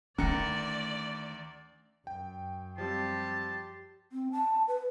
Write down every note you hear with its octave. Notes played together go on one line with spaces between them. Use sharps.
D2 D#3 A3 C#4 D5 A#5 C#7
F#2 G5
F3 G3 C4 G4 A5 C6
C4
A5
B4